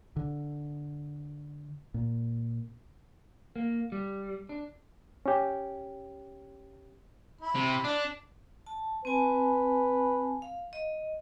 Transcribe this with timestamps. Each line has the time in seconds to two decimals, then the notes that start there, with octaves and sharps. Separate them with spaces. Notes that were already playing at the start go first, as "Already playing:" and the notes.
0.16 D3
1.94 A#2
3.56 A#3
3.92 G3
4.49 D4
5.26 C#4 G4
7.41 E4 B5
7.55 C3
7.84 D4
8.66 A5
9.05 C4 B4 G#5 A5
10.42 F5
10.73 D#5